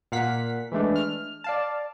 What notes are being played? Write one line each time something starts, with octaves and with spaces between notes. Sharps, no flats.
A#2 F5 F#5 B6
E3 G#3 A3 D4
F6
D5 F5 A5